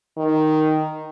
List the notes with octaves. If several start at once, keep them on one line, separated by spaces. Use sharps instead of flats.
D#3